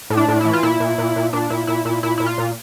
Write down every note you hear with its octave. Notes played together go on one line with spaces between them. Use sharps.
A2
D4
A2
E3 E4
F4
A#2 E4
A#2
A#2
A#2
A#2 D4
A#2 E4
A#2 E4
A#2 E4
A#2 E4
A#2 E4
F4
A#2